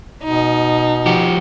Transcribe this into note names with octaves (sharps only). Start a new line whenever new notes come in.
B2 D#4
F3 F#4 G4